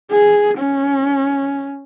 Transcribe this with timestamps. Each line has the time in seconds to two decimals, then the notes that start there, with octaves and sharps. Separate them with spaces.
0.11 G#4
0.58 C#4